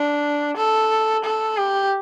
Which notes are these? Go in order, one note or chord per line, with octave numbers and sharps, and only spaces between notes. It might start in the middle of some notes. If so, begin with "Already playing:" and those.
Already playing: D4
A4
A4
G4